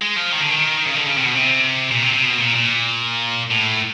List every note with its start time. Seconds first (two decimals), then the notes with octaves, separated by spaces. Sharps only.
0.02 G#3
0.16 F3
0.32 D#3
0.41 D3
0.50 D#3
0.86 C#3
0.96 D3
1.06 C#3
1.17 C3
1.25 B2
1.34 C3
1.91 A#2
2.02 C3
2.13 C3
2.23 B2
2.39 A#2
2.55 A#2
3.51 A2